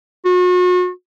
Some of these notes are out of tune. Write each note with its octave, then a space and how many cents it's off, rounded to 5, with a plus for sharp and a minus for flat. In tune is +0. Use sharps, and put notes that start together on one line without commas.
F#4 -40